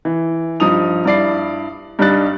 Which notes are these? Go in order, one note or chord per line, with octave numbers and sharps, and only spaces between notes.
E3
G2 F3 D#4 D#6 F7
G2 E4 D5 C7
G2 G3 D4 D#4 F#6 A6